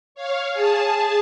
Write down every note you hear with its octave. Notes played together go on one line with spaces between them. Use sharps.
C#5 F5
G#4 A5